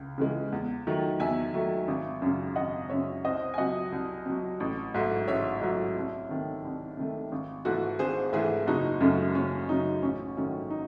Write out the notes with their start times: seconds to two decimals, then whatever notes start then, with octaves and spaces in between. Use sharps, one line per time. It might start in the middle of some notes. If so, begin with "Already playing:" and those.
Already playing: C#2
0.18 C#3 E3 G#3
0.52 E2
0.87 D#3 F#3 A3
1.20 E2 E5 G#5
1.54 D#3 F#3 A3
1.88 G#1
2.22 F#2 C#3
2.56 G#1 D#5 F#5
2.90 F#2 C#3 C#5 E5
3.24 C2 C5 D#5
3.54 G#5
3.58 C3 F#3 D#5 F#5
3.92 C2
4.26 C3 F#3
4.60 A1
4.94 G#2 F#3 A3
5.27 A1 C#5 E5
5.62 G#2 F#3 A3
5.96 C2
6.29 C3 D#3 A3
6.64 C2
6.97 C3 D#3 A3
7.32 G#1
7.65 G#2 E3 A3 F#4 A4
7.99 G#1 G#4 C5
8.33 G#2 E3 A3 E4 G#4
8.67 F#1 D#4 F#4
9.01 F#2 C#3 F#3 A3
9.35 F#1 C#4
9.69 F#2 C#3 F#3 A3 D#4
10.03 A1 C#4
10.37 G#2 D#3 F#3 A3 C#4
10.71 D#4